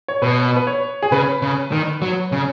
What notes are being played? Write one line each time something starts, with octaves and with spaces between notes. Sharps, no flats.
C#5
B2 B4
B4
C#5
G#4
C#3 B4
C#3
D#3
F#3
C#3